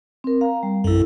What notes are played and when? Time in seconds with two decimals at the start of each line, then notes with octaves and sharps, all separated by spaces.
0.24 C4 A#4
0.41 F5 A#5
0.63 G3
0.84 A#1 F#2 E4 A4